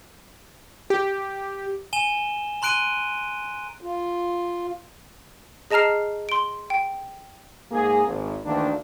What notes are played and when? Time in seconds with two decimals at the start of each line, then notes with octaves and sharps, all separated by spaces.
0.90 G4
1.93 G#5 E7 G7
2.62 A#5 C6 F#6 D7 D#7 G7
3.81 F4
5.71 G#4 D#5 A5 A#5 F6 C7
6.29 C6 D7
6.70 G5
7.72 G#2 A#3 G#4
8.07 G#1
8.45 D2 D#3 E3 A#3 D4